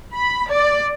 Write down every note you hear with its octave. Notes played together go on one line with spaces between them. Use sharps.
B5
D5